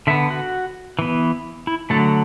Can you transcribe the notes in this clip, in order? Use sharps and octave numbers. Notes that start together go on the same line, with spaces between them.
D3 B3 E5
F#4
E3 B3
E4
D3 F#3 A3 A4